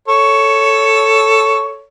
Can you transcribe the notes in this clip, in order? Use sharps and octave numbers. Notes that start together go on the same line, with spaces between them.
A4 C#5